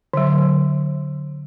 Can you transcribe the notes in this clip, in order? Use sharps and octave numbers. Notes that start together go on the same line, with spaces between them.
D3 F#3